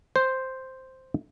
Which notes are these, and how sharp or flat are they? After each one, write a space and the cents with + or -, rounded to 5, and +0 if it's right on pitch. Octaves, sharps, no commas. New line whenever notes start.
C5 +0